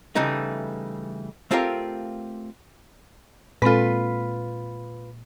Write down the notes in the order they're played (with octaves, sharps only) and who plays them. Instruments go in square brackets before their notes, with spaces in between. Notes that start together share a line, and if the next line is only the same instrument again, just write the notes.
[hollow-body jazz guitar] C#3 E3 G3 A3 D#4
A3 C4 F4 G4 A#4 F5
[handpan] A#2 [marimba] G#3 C4 A4 [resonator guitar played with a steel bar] F4 B4